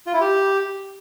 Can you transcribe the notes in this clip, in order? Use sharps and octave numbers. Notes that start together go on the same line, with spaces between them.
F4
E4
G4